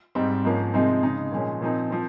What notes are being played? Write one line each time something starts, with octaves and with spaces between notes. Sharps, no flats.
G#2 G3 C4 D#4
G#2 F3 A#3 C#4
C3 F3 G#3 C4 D#4
C#3 G#3 D#4
A#2 F3 G#3 C#4
A#2 F3 C4 D#4
F3 C4